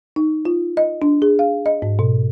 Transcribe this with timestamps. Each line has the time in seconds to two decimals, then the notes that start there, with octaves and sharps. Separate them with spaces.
0.16 D#4
0.45 F4
0.77 D#5
1.02 D4
1.22 G#4
1.39 F5
1.66 D#5
1.82 G#2
1.99 B2